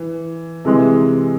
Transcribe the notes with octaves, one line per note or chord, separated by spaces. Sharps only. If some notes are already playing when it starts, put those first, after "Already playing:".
Already playing: E3
C3 E3 G#3